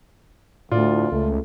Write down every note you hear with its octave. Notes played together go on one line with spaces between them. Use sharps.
D2 A2 F4 D5
C#2 A3